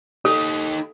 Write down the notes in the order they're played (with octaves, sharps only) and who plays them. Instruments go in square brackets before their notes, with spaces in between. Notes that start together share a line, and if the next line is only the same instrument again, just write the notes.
[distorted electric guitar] D#4 G4 [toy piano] A4